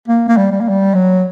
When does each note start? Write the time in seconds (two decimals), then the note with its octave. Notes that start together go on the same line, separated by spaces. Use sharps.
0.08 A#3
0.28 A#3
0.37 G3
0.52 G3
0.61 A#3
0.69 G3
0.94 F#3